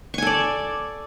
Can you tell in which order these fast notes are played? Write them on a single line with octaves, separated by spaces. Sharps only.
C#6 G#5 A4 D5